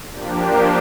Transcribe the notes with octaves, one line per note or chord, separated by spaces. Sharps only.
F3 A#3 D4 G4